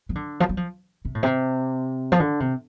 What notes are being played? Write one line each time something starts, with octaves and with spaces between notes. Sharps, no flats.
F3
D3
F3
G3
F3
C3
A2
C3
F3
D3
C3